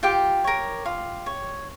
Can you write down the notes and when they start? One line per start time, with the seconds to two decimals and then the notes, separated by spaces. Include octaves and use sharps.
0.03 F4 G4 G5
0.44 A#4 C#5
0.85 F4
1.26 C#5